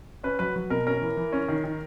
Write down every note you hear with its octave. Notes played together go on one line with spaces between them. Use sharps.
C#4 B4
F#3 B4
F#3
B2 A#4
C#4 A#4
E3
E3
C#4
D#3
D#3